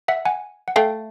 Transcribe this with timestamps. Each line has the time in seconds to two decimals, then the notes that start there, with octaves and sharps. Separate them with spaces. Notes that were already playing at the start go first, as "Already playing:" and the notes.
0.08 E5 F#5
0.25 F#5 G#5
0.68 F#5
0.76 A3 F5 G5